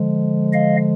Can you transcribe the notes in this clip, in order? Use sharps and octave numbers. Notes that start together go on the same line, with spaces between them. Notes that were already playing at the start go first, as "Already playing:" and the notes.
Already playing: D3 F3 G#3
D#5 F5